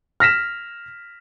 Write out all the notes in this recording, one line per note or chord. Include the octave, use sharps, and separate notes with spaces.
F6 A#6 B6 E7